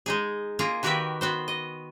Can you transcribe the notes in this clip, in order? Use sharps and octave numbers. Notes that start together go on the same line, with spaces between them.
G#3 D#4 G#4
A#3 F4 G#4 A#5
D#3 F#4 G4 A#4 B4 E5
B3 F#4 C5
D#5